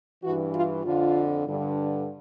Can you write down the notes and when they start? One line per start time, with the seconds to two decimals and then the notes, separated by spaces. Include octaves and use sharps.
0.23 G2 E3 F#4
0.54 F4
0.84 F2 D3 F4
1.46 G2 D3